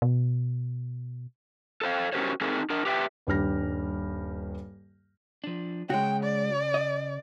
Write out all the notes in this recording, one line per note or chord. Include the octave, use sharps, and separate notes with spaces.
B2
A4 C5 F5
C#4 F#4 G4 A#4 C5 C#5
A3 C4 D#4 G#4 A#4
D4 A#4
G4 B4 E5 G5
D#1 G2 G4 F6 A#6
F3 D4
C#3 G#3 F#4 C#5 G5
D5
D#5